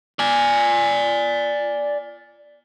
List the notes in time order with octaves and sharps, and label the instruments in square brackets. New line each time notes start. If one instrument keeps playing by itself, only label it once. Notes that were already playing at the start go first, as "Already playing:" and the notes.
[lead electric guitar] D5 G#5